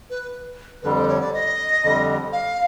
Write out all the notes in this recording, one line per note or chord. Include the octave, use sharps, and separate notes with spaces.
B4
F2 D3 G3 B4
C5
C#5
D5
D#5
F2 D3 G3
F5